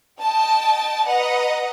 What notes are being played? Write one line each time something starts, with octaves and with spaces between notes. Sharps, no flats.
D#5 G5 A5
B4 D#5 F#5 A#5